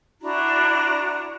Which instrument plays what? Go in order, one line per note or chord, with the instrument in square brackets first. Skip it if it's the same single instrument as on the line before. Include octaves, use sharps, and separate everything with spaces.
[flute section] D4 E4 F#4 A#5